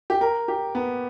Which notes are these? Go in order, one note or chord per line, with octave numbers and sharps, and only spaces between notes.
G4
A#4
G4
B3